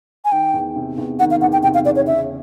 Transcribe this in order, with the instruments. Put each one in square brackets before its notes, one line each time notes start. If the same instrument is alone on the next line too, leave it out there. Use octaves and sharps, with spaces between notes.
[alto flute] G#5
[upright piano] D#3 [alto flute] G5
[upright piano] E2
C3
E2
[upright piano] D#3 [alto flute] F#5
[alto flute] F5
[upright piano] E2 [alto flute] F#5
[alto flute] G5
[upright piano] C3 [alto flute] G5
[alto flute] F5
[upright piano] E2 [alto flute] D5
[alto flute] C#5
[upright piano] C#3 [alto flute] E5